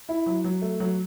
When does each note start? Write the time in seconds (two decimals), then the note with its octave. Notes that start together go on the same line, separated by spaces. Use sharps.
0.09 E4
0.26 F#3
0.44 F#3
0.62 A3
0.80 F#3